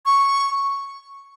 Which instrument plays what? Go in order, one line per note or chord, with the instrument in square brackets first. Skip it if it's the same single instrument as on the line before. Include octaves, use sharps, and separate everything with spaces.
[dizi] C#6